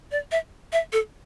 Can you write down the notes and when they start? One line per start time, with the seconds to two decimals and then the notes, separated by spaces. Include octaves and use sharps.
0.11 D5
0.31 E5
0.73 E5
0.92 A4